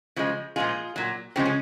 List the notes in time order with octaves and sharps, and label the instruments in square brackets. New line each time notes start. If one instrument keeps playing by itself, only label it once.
[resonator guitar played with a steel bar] C#3 F3 G#3
A#2 F3 G#3 F4 G#4
A#2 F#3
C#3 F3 G#3 C4
C#4